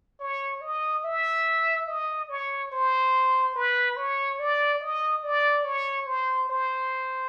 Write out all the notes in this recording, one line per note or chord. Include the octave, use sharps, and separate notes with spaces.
C#5
D#5
E5
D#5
C#5
C5
B4
C#5
D5
D#5
D5
C#5
C5
C5